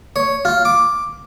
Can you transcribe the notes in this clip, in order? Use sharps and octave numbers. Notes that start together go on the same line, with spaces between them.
C#5
F4
D6